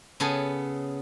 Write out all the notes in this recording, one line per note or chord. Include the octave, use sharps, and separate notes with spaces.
C#3 B3 A4 G#5